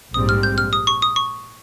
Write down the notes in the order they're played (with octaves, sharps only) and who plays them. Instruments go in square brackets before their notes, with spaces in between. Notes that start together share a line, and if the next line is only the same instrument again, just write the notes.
[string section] A#1 G#2 G3 C4 [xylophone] D#6
[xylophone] F6
G6
F6
D#6
C#6
D#6
C#6